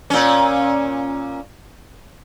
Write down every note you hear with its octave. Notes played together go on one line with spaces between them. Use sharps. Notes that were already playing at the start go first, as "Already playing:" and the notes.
A#2 C#4